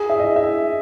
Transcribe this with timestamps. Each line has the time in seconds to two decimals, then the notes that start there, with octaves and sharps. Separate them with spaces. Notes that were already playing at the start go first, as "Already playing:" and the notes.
Already playing: G#4
0.10 E5
0.20 D#5
0.36 E5